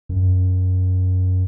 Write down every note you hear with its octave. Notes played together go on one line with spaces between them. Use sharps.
F#2